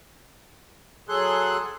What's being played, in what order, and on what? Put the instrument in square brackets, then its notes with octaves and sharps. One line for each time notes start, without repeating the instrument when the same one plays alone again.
[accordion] F#3 G#4 A4 C6 F#6